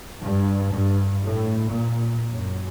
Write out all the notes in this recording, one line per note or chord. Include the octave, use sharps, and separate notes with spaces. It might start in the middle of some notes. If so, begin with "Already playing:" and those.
G2
G2
A2
A#2
F#2